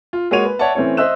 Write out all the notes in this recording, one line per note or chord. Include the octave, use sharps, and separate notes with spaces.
F4
G#3 A#3 F#4 C#5 D#7 F7
B4
C#5 D5 E5 F#5 A5
E3 A3 C4 C#4 C#5
C5 D#5 E5 E6 F#6 E7